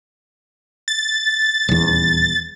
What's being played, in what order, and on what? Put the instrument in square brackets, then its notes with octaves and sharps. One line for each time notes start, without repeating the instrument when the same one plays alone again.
[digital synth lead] A6
[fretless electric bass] D#1 E2